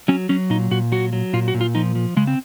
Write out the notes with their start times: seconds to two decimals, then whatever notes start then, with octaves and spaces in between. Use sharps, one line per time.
0.08 F#3 C#4
0.29 F#3 C#4
0.50 A#2 D#4
0.71 A#2 F#4
0.92 F#3 F#4
1.13 F#3
1.33 A#2 F4
1.48 F#4
1.54 A#2
1.61 F4
1.75 F3 D#4
1.95 F3
2.17 C#3 G#3
2.27 C4